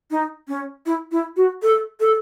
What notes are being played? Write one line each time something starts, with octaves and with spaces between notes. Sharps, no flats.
D#4
C#4
E4
E4
F#4
A4
A4